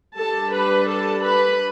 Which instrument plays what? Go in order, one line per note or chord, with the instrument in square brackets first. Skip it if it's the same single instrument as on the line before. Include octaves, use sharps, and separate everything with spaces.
[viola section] G3 D4 A4 A5
B4 B5
A4 A5
B4 B5